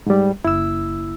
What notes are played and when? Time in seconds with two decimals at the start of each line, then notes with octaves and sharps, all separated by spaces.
0.06 G#2 G3
0.44 F#1 E4 E6